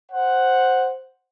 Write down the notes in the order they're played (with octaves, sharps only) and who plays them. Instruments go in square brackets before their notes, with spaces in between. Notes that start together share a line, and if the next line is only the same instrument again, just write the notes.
[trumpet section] C5 F#5